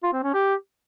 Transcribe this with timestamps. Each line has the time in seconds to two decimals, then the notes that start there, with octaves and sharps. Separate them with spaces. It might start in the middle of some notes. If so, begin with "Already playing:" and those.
0.03 F4
0.13 C4
0.24 C#4
0.34 G4